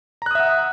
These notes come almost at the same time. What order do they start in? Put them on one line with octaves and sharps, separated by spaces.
A#5 F#6 D#6 E5 F#5